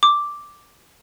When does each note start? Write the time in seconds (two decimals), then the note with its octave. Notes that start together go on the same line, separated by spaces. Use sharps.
0.03 D6